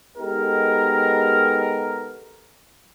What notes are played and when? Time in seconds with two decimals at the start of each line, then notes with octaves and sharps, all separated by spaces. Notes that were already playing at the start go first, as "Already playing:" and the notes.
0.18 G#3 B3 D#4 G4 A4 A#4